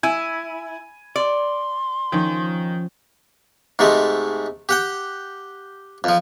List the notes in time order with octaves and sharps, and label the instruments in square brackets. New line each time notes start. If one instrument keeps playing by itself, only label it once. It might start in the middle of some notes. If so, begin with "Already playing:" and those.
[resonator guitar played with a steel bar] E4 [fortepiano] G#5
[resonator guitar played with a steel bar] D5 [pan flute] C6
[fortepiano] D#3 [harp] F3 C#4
[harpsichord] G#2 C3 G#3 A3
G4 F#5 G5
F2 F3